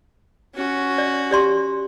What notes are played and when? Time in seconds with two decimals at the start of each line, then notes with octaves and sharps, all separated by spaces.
0.55 C#4 F#4
0.98 D5
1.31 G4 D5 C6